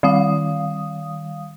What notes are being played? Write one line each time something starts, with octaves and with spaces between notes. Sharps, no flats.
D#3 G3 F5 D#6